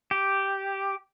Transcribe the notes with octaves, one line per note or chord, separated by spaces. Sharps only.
G4